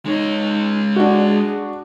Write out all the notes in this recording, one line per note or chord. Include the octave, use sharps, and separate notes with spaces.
G#3 D#4 C#5
D4 F#4 G#4